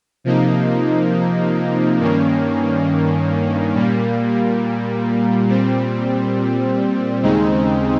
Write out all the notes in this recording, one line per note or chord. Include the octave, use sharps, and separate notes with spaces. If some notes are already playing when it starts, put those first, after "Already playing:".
C3 F3 A#3 D#4
G2 D#3 A#3 C#4
A#2 G3 A#3
A#2 G3 C4
D#2 C#3 G#3 C4 D#4